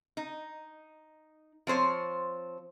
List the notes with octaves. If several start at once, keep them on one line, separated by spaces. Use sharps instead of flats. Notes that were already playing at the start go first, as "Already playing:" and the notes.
D#4
F3 C4 C5 C#5